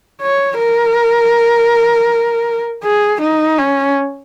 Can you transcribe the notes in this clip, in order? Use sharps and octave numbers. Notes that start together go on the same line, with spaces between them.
C#5
A#4
G#4
D#4
C#4